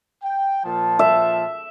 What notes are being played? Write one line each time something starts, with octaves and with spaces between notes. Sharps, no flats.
G5
A#2 F3 A5
E5